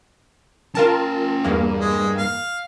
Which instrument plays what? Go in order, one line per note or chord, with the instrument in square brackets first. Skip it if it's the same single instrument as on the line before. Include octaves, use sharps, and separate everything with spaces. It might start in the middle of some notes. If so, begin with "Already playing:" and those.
[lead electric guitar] C#4 G5 [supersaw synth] F4 A#4 A5
[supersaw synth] E2 A#3 [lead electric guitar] G2
[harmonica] G#3
F5